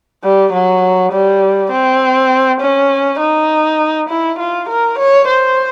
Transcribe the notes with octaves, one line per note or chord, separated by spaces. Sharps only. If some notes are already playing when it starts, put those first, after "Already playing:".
G3
F#3
G3
C4
C#4
D#4
E4
F4
A#4
C#5
C5